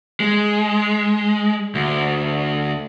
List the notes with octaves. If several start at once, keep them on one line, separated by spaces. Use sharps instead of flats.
G#3
D2